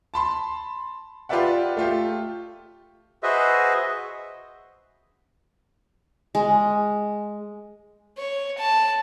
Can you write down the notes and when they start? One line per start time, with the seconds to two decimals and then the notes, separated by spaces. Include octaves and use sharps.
0.14 A5 B5 C6
1.29 F4 G4 B4 D5 E5 F#5
1.77 A3 F4 G4
3.23 F#4 G#4 B4 C5 D#5 E5
6.35 G#3
8.18 C#5
8.58 A5